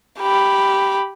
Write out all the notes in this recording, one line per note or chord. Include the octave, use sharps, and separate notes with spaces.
G4 B5